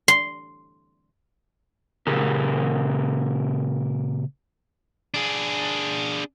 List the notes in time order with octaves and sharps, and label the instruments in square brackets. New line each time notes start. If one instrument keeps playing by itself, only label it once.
[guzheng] C6
[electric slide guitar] A#2 C#3 G4 G#4 A#4
[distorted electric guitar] D4 G#4